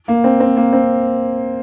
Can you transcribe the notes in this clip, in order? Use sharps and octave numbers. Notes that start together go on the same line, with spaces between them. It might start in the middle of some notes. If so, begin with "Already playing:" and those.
A#3
C4
C4
A#3
C4